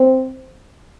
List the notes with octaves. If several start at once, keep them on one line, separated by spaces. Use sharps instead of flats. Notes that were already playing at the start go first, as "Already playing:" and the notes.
Already playing: C4